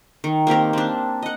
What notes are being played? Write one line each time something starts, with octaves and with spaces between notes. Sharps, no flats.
D#3
A#3 C4 G4 A#4
C4 D4
D#5 F#5